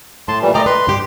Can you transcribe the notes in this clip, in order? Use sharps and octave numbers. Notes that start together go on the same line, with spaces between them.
A2 A5 C6
A#2 E3 G3
A3 D5 D#5 G5 A#5
B4 C6
G2 G4